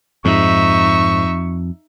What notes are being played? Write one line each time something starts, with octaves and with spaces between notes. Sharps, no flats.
F2 G#2 D#4 E5 C#6